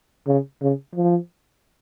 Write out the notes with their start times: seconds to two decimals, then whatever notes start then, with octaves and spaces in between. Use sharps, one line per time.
0.27 C#3
0.62 C#3
0.96 F3